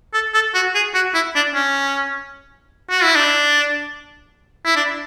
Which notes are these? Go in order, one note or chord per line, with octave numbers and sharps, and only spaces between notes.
A4
A4
F#4
G#4
F#4
E4
D4
C#4
F#4
E4
D4
E4
D4